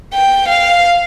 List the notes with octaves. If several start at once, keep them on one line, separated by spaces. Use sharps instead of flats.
G5
F5